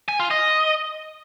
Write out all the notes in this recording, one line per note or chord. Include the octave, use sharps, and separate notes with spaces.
G#5
F4
D#5